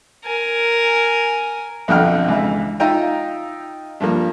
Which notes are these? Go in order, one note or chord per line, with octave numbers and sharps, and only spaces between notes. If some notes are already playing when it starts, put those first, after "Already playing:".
A#4 G#5
B1 F2 D3 F#5 G5 F6
C#2 E3 E5
D#4 F4 D#5 E5 G5 A#5
G2 F3 A#3